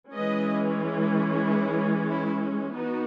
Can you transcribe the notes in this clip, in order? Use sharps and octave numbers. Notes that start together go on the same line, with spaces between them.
E3 G#3 C#4 B4 D#5
E4
E4
B3 D#4 F#4